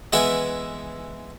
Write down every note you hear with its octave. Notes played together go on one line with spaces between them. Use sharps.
E3 G#3 B3 E4 G#4 E5